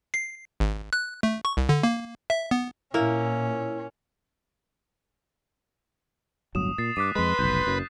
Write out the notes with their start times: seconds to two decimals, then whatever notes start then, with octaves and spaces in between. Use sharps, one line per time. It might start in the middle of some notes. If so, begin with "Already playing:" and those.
0.14 C7
0.60 G#1
0.93 F#6
1.23 A3
1.45 C#6
1.57 C2
1.69 D3
1.83 A#3
2.30 E5
2.51 B3
2.94 A#2 A#3 C#4 E4
6.55 D1 G1 F#3 D#6 E7
6.78 A#2 A6 C7
6.97 G2 D6 F#6 B6 D#7
7.15 F2 G#3 B4 C6
7.39 F1 B1 G6 B6
7.67 F#1 F#2